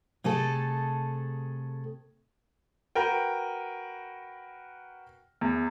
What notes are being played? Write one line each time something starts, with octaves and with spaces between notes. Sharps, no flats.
C3 A3 G#4 A4
F#4 A#4 B4 G5
E2